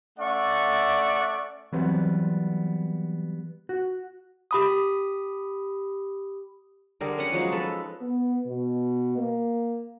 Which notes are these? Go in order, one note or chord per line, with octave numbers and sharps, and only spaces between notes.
A3 C#4 D5 E5 F#5 C#6
E3 F#3 G3 B3 C4
F#4
G4 B5 D#6
D3 G3 G#4 A#4
C#4 B4 F#5
F3 F#3 G#3 D#4
G#3 A4 B4
B3
B2
A#3